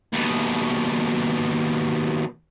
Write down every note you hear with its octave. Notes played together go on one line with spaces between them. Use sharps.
D#2 B2